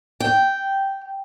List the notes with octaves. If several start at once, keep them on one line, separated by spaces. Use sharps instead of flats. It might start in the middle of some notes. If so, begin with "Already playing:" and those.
G5